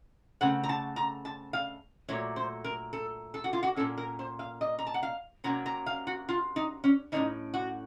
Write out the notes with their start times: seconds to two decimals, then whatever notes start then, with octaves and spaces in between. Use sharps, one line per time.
0.41 C#3 A3 C4 F#5
0.63 A#5
0.69 A5
0.96 A#5
1.25 A5
1.53 F5
2.08 A#2 F#3 A3 C#5
2.36 C5
2.64 A#4
2.93 A4
3.34 A4
3.44 F#4
3.53 F4
3.63 F#4
3.76 A#2 F#3 A#3 C#4 A4
3.97 A#4
4.19 C5
4.39 F5
4.61 D#5
4.78 A#5
4.87 A5
4.94 F#5
5.03 F5
5.44 C3 F#3 A#3 C#4 A#5
5.66 A#5
5.86 F5
6.07 F#4
6.29 F4
6.56 D#4
6.84 C#4
7.12 A2 A3 C#4 D#4
7.54 F#4